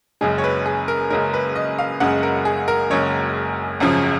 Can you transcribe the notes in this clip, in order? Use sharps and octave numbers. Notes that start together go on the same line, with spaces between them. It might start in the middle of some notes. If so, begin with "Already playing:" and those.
F#1 F#2 C#3 G#3 G#4
C#5
B4
G#4
A#4
F#1 F#2 C#3 G#3 A#4
B4
D#5
F5
F#1 F#2 C#3 G#3 F#5
A#4
G#4
A#4
F#1 F#2 C#3 G#3 C#5
G#1 F#2 C#3 F3